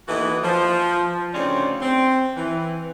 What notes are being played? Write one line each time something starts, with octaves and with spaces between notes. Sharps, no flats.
D#2 E3 B3 F#4 A4 D#5
F3
D2 C#3 C4 C#4 D#4 D5
C4
E3